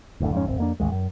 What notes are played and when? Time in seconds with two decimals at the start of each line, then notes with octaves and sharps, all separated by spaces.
0.20 F#1 D2 A2 D3
0.33 F2 G#2 C#4
0.46 D1 G#1 C4
0.58 F2 A#3 D4
0.80 A1 D#2 G#3
0.92 F#2